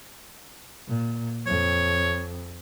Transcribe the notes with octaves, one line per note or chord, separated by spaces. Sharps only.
A#2
F2 C#5